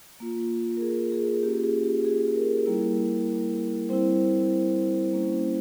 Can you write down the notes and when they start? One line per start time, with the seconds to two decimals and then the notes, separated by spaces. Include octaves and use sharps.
0.20 A#3 F4
0.77 A#4
0.81 G#4
1.12 G#4
1.43 A#3 C#4 F4 G4
1.64 G#4
1.83 G4
2.05 G#4
2.35 A#4
2.66 G3 A#3 E4
3.89 G3 C4 E4 C5
5.12 G3 A#3 C#4 E4